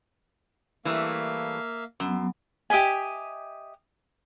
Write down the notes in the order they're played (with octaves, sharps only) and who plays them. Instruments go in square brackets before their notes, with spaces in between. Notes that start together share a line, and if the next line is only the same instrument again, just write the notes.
[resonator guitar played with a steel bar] E3 G3 A3 [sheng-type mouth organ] A#3 E5 F5
[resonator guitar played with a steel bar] F#2 [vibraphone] F#3 B3
[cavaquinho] G4 D#5 E5 G#5